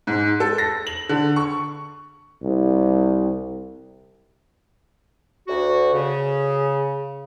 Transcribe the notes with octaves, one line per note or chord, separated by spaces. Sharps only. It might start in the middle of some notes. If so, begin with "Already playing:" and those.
G#2
A4
A#6
F#7
D3
C#6
C2
D2 F#4
C#3